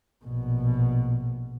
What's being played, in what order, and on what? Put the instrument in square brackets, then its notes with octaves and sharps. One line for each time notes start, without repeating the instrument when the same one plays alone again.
[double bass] A#1 B2